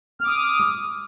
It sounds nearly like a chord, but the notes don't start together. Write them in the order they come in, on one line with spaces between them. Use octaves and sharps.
F6 D6 D#6